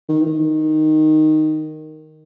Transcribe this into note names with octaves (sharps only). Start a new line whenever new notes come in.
D#3
E3
D#3